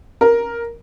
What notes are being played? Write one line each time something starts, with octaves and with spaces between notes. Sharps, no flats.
A#4